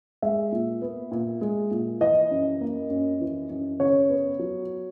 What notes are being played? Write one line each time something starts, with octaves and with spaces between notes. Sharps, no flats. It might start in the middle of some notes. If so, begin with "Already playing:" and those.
G#3 E5
A#2
B3
A#2
G#3
A#2
E3 D#5
F#2
A#3
F#2
E3
F#2
C#3 C#5
B3
F#3